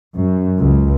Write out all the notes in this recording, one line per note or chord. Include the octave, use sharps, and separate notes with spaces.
F#2
C#2